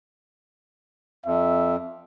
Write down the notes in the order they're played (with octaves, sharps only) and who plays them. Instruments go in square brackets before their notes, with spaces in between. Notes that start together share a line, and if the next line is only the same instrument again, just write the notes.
[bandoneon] F2 [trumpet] E5